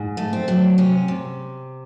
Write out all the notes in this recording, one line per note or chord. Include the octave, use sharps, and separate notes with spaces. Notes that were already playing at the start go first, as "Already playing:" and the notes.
Already playing: G#2
A3
C4
F#3
C3 C#4
C3